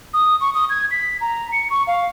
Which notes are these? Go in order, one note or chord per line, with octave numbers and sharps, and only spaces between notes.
D#6
C#6
D#6
G#6
B6
A#5
C#7
C#6
F5